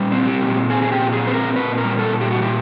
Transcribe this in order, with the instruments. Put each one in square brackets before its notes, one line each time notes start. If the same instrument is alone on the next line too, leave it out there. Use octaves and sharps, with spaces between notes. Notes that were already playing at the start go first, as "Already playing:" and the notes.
Already playing: [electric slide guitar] A#2 G3
C4
G4
A#2
C4 G#4
G#4
G4
A#2
G#4
C4 B4
A#4
A#2 B4
A#4
G3
A4
A#2
G4
F#4
A#2 G4